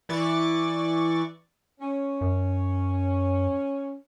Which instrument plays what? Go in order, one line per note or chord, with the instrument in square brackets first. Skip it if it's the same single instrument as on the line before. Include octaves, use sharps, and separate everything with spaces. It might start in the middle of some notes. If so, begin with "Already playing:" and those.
[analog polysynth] E3 D5 C#6 A6
[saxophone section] C#4
[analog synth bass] F#2